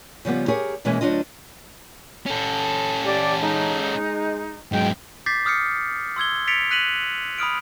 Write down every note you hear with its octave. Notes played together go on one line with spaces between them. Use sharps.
C#3 F3 G3 B3
G4 G#4 A#4 C#5
B2 E3 G#3 A#3 C#4 G#4
D2 G2 F#3 D4 F4 D#5
C#4 A4
G4 D5
G#3 D#4
G#2 F#3 G#3 G5
D6 G6 A6 B6 C7
D6 D#6 F6 G6 C7 C#7
C6 E6 G#6 G7
A6 B6 C#7 D7 F7
F#6 B6 D#7 F7 F#7
B5 D#6 F6 D7